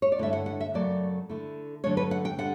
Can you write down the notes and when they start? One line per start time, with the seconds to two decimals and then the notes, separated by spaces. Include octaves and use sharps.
0.02 C#5
0.12 D5
0.18 G2 D3 A3 E4 E5
0.33 F#5
0.46 F#5
0.61 E5
0.74 F#2 C#3 F#3 A3 D5
1.29 D3 A3 E4
1.84 D3 F#3 A3 D4 C#5
1.97 B4
2.11 F#5
2.25 G5
2.38 D3 G3 F#5